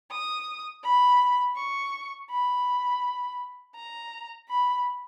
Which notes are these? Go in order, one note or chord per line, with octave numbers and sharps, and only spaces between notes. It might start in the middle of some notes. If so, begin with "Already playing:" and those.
D#6
B5
C#6
B5
A#5
B5